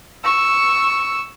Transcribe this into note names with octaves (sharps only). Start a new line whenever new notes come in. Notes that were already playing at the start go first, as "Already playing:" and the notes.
C#6 E6